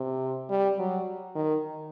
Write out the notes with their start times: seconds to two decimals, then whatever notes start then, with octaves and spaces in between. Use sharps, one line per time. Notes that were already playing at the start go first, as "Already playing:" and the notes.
Already playing: C3
0.50 G3
0.79 F#3
1.35 D#3